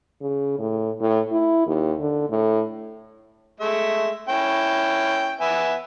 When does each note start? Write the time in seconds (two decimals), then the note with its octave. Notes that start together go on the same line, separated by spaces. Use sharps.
0.21 C#3
0.59 A2
1.01 A2
1.32 E4
1.67 D#2
1.99 D3
2.30 A2
3.60 G#3 A3 E5
4.29 C#4 E4 G5
5.41 B3 E5 G#5